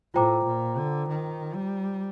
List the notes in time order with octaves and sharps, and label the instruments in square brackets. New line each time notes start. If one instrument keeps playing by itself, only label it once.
[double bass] A2 [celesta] F4 C5 G5 A#5 D6
[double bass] A#2
D3
D#3
G3